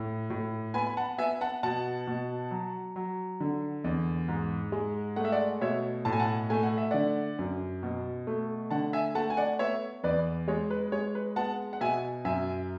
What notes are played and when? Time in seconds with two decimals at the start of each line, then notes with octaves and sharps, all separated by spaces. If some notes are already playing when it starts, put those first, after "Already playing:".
Already playing: A2
0.30 A2
0.74 B3 G#5 B5
0.87 B5
0.97 F#5 A5
1.18 B3 E5 G#5
1.41 F#5 A5
1.63 B2 F#5 A5
2.07 B2
2.51 F#3
2.96 F#3
3.40 D3
3.84 E2
4.28 G#2
4.72 G#3
5.16 A3 F#5
5.25 E5
5.32 D5 F#5
5.61 B2 C#5 E5
6.05 A2 A5
6.13 G#5
6.20 F#5 A5
6.50 A3 G#5
6.63 F#5
6.78 E5
6.91 D3 D5 F#5
7.39 F#2
7.83 B2
8.27 A3
8.71 D3 F#5 A5
8.93 E5 G#5
9.15 A3 F#5 A5
9.30 G#5
9.37 D5 F#5
9.59 B3 C#5 E5
10.03 E2 B4 D5
10.48 G#3 C#5
10.70 B4
10.92 G#3 C#5
11.15 B4
11.36 B3 F#5 A5
11.73 F#5
11.81 B2 E5 G#5
12.25 F#2 E5 G#5